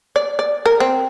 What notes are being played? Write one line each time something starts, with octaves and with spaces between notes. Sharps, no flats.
D5
D5
A#4
C4